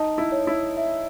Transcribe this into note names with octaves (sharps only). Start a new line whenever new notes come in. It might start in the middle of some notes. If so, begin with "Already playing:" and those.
Already playing: D#4 A5
E4
C#5
E4
E5